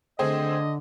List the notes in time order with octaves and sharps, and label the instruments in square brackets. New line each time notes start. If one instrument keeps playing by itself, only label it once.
[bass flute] D3 [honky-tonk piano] A3 C4 G#4 [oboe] D#5